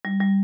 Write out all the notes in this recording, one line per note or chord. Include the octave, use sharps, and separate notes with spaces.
G3
G3